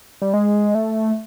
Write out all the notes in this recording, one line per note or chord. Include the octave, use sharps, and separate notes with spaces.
G3
G#3
A3